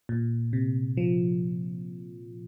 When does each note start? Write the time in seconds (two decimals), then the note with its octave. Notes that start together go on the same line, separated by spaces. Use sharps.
0.09 A#2
0.53 C3
0.97 F3